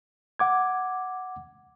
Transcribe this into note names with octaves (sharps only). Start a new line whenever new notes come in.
F#5 D6 G#6